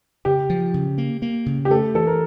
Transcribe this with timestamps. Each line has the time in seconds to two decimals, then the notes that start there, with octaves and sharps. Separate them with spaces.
0.25 C#3 G4
0.50 F3
0.74 C#3
0.98 A#3
1.22 A#3
1.46 C#3
1.65 G4
1.70 A3 A4
1.95 E3 A4
2.07 A#4